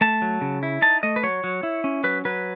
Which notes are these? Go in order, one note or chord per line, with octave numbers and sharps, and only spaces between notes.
A3 A5
F#3
C#3
E4
D#4 A5
A3 D#5
B4
F#3 C#5
F#3
E4
C#4
F#3 B4
F#3 B4